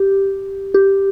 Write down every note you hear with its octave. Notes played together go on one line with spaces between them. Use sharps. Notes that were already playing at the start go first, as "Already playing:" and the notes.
Already playing: G4
G4